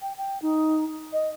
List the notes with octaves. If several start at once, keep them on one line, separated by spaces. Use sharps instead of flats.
G5
G5
D#4
D#5